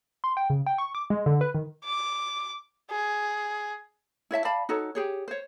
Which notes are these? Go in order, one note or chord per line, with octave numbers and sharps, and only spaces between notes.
C6
G5
C#3
G5
C#6
D6
G#3
D3
B4
D#3
D6
G#4
E4 C#5 E5 A5
D5 F5 A5 B5
D#4 F#4 A4 C#5
G4 G#4 C#5
C5 C#5